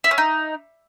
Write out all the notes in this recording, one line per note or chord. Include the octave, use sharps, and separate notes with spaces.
E4
C#4
D#4